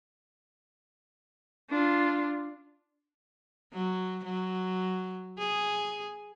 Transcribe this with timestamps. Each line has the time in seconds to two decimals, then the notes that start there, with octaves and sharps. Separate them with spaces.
1.70 D4 F4
3.73 F#3
4.25 F#3
5.38 G#4